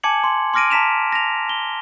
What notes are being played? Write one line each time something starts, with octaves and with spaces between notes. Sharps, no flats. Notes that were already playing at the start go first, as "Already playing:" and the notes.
G#5 A5 D6 G#6 C#7 F#7
C6
C6 D6 F6 A#6 D7 D#7
A5 A#5 B6 E7 F7
A#6 F7
G7